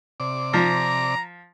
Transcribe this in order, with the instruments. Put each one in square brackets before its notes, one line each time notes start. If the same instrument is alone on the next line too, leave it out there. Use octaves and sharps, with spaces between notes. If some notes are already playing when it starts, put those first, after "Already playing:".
[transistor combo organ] C3 D5 D6
[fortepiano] F3 [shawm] A#5